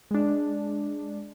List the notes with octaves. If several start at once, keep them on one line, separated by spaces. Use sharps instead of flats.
G#3 D4